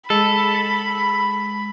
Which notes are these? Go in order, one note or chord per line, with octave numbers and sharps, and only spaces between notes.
G#3 A4 B5